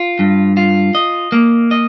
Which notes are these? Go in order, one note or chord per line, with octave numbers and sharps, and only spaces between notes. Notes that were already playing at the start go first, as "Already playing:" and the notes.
Already playing: F4
G2
F4
D#5
A#3
D#5